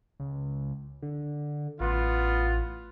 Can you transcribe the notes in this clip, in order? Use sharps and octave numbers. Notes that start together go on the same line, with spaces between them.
C#2
D3
A1 B3 F4